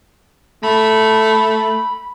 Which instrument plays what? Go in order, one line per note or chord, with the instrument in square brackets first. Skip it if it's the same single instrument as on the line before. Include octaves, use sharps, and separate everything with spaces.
[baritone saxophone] A3 [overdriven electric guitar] B5